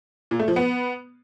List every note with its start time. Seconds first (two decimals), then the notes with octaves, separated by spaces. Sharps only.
0.31 A#2
0.39 A3
0.48 F3
0.56 B3